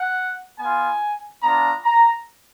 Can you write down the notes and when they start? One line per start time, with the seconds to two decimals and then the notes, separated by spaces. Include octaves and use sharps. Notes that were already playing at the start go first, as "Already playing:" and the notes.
Already playing: F#5
0.59 B3 F4 G#5
1.41 B3 D4 F4 A#5
1.83 A#5